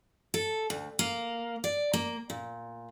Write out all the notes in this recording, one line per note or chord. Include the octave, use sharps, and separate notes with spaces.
A4
D2
A#3
D5
A#3
A#2